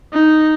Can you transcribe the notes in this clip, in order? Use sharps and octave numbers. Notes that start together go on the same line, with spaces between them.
D#4